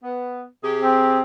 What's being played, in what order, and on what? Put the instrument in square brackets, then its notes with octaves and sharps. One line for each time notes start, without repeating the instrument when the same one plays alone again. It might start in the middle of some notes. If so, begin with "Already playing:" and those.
[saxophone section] B3
C3 G4 G#4
[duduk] C4